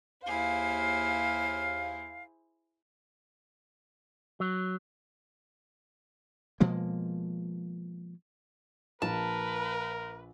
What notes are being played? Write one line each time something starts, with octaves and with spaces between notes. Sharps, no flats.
D#2 E4 G#4 C5 F5
F#3
B2 F3 G#3 A#3
A#1 A#4 B4 A5